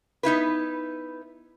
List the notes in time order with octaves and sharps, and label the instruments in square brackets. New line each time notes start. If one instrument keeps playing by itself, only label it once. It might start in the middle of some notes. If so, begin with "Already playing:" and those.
[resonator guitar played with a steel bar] B3 D#4 E4 B4